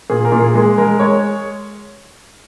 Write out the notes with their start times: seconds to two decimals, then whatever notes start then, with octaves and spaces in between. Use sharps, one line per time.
0.10 A#2 G#4
0.25 A#4
0.32 A#2
0.40 G#4
0.54 G#3 G#4
0.78 G#3 A#4
1.00 G#3 C#5